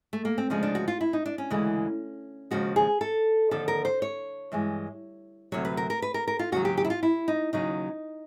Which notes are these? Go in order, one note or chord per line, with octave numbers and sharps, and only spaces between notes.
A3
A#3
C4
D2 C#3 F3 G#3 C#4
D4
F#4
F4
E4
D#4
D4
C#4
D2 C#3 E3 G#3
D#2 C#3 F3 G#3 F#4
G#4
A4
D#2 D3 F3 A4
A#4
C5
C#5
G2 E3 G#3
D2 C3 F#3 C#5
B4
A#4
A#4
B4
A#4
A#4
F4
D#2 C#3 F#3 F#4
G4
G4
E4
F4
E4
D#4
D#2 C#3 F#3 D#4